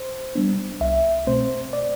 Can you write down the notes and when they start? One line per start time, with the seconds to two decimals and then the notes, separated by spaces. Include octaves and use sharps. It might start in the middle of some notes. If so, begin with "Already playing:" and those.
Already playing: C5
0.35 G3 B3 D4
0.81 C2 E5
1.27 B2 A3 C4 C5
1.73 D5